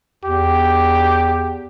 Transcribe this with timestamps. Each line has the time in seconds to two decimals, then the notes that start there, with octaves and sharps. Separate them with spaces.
0.24 E2 G4